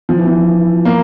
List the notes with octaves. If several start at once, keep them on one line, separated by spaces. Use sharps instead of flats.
F3
E3
F3
A#3